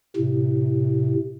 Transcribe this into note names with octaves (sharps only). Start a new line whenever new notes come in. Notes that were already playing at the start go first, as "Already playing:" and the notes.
A2 C3